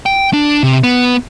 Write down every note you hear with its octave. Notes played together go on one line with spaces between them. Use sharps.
G5
D4
C3
B3